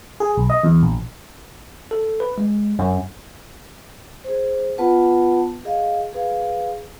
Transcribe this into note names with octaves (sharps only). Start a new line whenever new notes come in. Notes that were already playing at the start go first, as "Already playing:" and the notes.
G#4
B1
D#5
E2
A#1
A4
B4
G#3
F#2
G#4 C5
B3 F4 B4 F#5 A5
G#4 D#5 F5
G#4 B4 F5